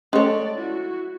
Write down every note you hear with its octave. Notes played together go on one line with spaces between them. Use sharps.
G#3 A3 C#4 A4 C#5 D5
E4 F#4